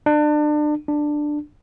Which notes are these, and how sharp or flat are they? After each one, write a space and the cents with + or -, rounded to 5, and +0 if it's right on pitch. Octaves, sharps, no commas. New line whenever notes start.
D4 +30
D4 +10